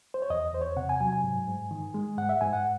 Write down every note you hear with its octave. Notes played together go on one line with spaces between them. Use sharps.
C5
C#5
E2 D#5
E2 C5
C#5
C3 F#5
G#5
F#3 G#5
G#5
G#2
G#2
D#3
G#3
G#2 F#5
E5
G#2 G#5
F#5